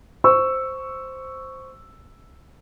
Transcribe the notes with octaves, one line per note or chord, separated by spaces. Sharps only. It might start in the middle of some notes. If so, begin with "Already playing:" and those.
C5 C#6 E6